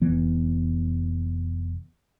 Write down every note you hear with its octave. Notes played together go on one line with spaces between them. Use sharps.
F1 E3 B3